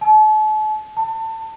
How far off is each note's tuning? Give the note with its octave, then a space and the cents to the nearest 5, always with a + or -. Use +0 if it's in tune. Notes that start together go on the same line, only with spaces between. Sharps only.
A5 -40
A5 +25